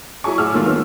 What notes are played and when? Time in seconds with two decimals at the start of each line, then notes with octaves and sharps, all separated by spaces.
0.24 F#3 E4 G#4 G#5 C#6
0.38 A2 G#4 F#5 D6 E6 F6
0.54 D#3 F#3 G#3 A3 C#4 F4
0.66 D#3 B3 E6